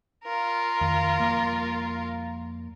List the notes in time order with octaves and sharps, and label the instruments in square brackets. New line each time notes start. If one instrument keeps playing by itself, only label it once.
[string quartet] F4 A#4
[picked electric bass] F2 D#3
F2 G3 A#3